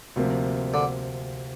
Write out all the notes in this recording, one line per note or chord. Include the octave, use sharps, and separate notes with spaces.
D2 C3 F3 A#3
D3